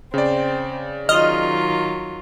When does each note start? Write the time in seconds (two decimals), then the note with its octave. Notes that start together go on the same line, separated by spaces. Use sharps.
0.14 C#3 C4 D5
1.09 D#3 F#3 F4 D#5 F6